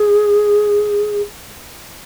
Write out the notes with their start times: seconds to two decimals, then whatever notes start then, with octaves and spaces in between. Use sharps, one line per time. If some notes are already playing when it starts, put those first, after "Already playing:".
Already playing: G#4